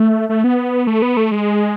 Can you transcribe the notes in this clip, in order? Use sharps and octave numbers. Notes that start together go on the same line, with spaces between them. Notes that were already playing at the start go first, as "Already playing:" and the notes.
Already playing: A3
A3
B3
A3
B3
A3
G#3